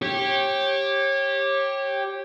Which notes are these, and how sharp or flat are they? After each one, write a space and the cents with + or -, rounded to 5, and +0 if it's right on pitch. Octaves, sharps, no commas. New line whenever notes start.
G4 +0 C#5 -25